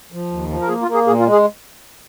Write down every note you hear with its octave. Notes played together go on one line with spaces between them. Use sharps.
F3
D#2
F3
A#4
A#3 G#4
F4
A#3
G#4
A#2 G#4
F4
G#3
G#4